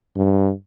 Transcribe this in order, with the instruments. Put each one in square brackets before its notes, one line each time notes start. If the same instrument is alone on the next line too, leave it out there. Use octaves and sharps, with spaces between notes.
[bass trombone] G2